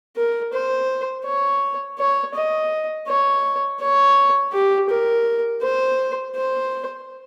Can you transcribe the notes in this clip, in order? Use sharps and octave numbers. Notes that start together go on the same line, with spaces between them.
A#4
C5
C#5
C#5
D#5
C#5
C#5
G4
A#4
C5
C5